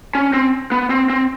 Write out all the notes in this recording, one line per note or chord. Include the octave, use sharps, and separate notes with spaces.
C#4
C4
B3
C4
C4